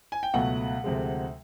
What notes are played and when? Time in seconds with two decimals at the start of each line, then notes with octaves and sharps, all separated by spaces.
0.12 G#5
0.23 G5
0.34 C#2 B2 F#3 A3 F#5
0.84 D2 C3 F3 G#3